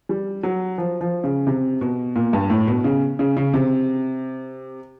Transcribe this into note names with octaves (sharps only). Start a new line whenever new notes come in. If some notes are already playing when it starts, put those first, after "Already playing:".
G3
F#3
F3
F3
C#3
C3
B2
A#2
G2
A2
B2
C#3
C#3
C#3
C3